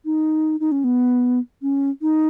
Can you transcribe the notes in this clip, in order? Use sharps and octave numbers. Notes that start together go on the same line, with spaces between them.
D#4
D#4
C#4
B3
C#4
D#4